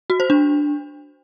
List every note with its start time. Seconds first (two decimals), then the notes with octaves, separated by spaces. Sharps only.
0.10 F#4
0.20 C5
0.30 D4